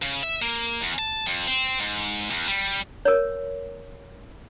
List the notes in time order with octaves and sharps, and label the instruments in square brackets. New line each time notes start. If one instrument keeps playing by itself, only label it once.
[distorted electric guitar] C#3
E5
A#3
E2
A5
F2
C4
G#2
E2
G3
[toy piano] A#4 C#5